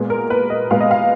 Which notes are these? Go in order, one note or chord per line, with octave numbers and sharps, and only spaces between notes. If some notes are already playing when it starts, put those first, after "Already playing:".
Already playing: A#2 G#3 B3 G#4
A#4
B4
D#5
A#2 G#3 B3 F5
D#5
F5